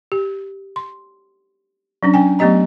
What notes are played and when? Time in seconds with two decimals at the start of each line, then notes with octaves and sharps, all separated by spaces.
0.12 G4
0.76 C6
2.03 F#3 C#4 D4
2.14 C#4 G5 G#5
2.39 F#3 A3 B3 G4 D#5 A#5